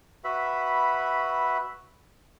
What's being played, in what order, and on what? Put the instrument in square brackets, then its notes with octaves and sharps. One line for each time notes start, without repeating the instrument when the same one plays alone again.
[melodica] F#4 B4 E5 B5